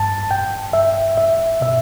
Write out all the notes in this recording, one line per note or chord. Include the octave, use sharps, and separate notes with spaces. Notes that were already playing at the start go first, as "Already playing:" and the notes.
Already playing: G2 A5
G2 G5
G2 E5
G2 E5
B2 E5